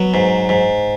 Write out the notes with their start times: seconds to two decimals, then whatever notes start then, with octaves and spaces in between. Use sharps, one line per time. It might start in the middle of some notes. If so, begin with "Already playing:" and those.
Already playing: F#3 B3
0.14 G#2
0.49 G#2